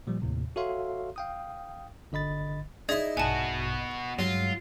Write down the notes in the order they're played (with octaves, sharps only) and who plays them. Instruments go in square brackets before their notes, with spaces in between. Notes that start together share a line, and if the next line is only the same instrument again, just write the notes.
[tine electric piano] A#2 F3 G3
D#2 A2 C3
F#4 A4 C#5 E5 F5 C6
F5 G5 D#6
G1 D3 D#5 B5 A6
[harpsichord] D#4 E4 [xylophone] G#4 D5 G#6
[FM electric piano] A#1 G2 B2 [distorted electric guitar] B3 F#4 [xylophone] G#5 A5
[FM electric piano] G2 G#3 [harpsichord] F#3 [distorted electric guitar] F4